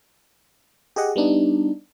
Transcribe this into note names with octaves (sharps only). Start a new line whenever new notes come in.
G4 G#4 D#5 F#5
G3 B3 D4 D#4